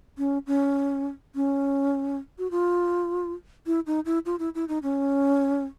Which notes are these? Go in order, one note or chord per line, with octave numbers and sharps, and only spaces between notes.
C#4
C#4
C#4
F#4
F4
E4
D#4
E4
F4
E4
E4
D#4
C#4